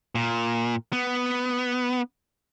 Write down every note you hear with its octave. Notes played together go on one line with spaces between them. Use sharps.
A#2
B3